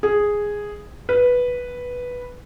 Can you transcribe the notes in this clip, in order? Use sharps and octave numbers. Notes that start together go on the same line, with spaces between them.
G#4
B4